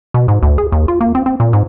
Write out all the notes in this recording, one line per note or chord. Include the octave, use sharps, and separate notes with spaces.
B2
G#2
D2
G#4
D#2
F4
A#3
C4
C4
A#2
G#2